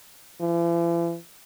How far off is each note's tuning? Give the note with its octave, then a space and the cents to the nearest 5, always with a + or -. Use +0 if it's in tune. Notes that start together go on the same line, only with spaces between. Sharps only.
E3 +45